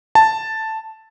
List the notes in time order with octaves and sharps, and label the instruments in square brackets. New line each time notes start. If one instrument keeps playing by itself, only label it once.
[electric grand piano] A5